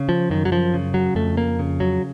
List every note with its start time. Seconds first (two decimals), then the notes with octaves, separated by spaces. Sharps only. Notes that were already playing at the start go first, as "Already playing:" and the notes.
Already playing: C#3
0.09 F3
0.30 F#2 D#3
0.45 F#3
0.52 F3
0.74 C#3
0.94 F#3
1.15 F2 A3
1.37 A#3
1.59 C#3
1.80 F#3